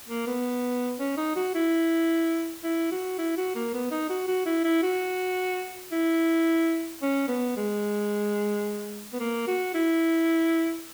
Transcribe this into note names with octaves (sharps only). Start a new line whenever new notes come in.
A#3
B3
C#4
D#4
F#4
E4
E4
F#4
E4
F#4
A#3
B3
D#4
F#4
F#4
E4
E4
F#4
E4
C#4
B3
G#3
B3
A#3
F#4
E4